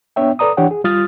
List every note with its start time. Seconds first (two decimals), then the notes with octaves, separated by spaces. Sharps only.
0.16 B3 D4 C#5 E5 G5
0.39 A4 B4 D5 A#5 D#6
0.57 E3 D4 G4 C#5 F#5 G5
0.71 G#4
0.84 G3 F4 D#6 F6 A6